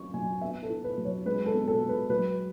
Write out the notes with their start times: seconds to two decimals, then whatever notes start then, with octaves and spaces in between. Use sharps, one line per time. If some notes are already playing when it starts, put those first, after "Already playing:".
Already playing: F#3 C#4 C#6
0.14 F#3 G#5
0.41 B3 E5
0.63 A4
0.70 E4
0.84 B4
0.98 F#3
1.05 C#5
1.26 G#3 B4
1.46 A4
1.54 B2
1.68 A4
1.82 G#3
1.89 B4
2.10 F#3 B4